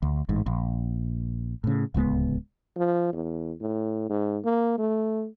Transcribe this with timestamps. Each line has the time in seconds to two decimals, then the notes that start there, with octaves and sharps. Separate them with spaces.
0.02 D2
0.29 A1 G#2
0.46 A#1
1.64 A2 C#3
1.94 D1 C#2 G#3 B3
2.76 F3
3.13 E2
3.61 A2
4.09 G#2
4.45 A#3
4.78 A3